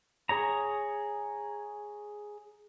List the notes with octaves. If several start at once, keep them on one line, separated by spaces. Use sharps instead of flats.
G#4 C#5 A#5